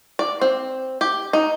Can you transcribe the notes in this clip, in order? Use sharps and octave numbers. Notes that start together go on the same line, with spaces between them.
D5
C4
G4
D#4